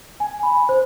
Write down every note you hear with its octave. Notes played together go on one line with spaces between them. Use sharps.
G#5
B5
C5